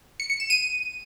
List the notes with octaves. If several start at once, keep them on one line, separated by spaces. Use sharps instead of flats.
C#7
C#7
E7
D#7